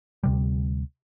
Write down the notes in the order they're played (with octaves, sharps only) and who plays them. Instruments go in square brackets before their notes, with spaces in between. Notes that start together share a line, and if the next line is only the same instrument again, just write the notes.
[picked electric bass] D2 C3 G3